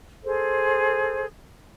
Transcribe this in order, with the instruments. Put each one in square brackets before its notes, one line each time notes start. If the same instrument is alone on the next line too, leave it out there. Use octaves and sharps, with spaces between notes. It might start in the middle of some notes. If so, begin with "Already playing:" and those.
[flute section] G#4 A4 C5